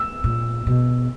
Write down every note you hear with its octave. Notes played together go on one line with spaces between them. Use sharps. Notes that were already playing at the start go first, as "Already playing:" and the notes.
Already playing: E6
A#2
B2